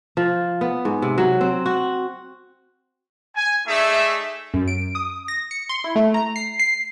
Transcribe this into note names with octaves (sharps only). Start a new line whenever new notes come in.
F3
B3
G#2
C3
F#3
C4
F#4
G#5
A3 D#4 G#4 D5 E5
F#2
D7
D#6
A#6
C#7
C6
E4
A3
A#5
C7
C7